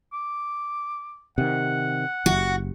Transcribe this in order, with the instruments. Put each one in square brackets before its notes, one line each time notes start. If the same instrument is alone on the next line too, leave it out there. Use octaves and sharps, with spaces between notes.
[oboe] D6
[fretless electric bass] C3 D#3 [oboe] F#5
[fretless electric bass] F#1 [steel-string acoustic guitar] F#4